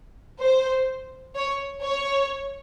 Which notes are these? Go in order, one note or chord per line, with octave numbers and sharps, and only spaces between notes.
C5
C#5
C#5